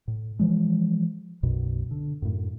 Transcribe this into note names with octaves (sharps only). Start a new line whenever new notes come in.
A2
E3 F3 G#3
B1 F#2 B2
D3
F#2 A2